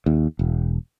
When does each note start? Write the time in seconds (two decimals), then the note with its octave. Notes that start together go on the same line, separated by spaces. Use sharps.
0.06 D#2
0.39 E1